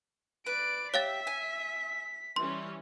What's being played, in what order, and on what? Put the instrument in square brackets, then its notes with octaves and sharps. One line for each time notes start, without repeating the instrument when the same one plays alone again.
[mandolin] B4 [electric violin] D5 D7
[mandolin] G4 [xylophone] C#5 F5 A6 [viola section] E5 [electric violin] B6
[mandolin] G#5
[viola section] E3 G3 C#4 [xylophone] C6